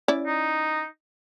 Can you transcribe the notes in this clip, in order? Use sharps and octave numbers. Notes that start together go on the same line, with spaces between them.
C#4 E4 D5
D#4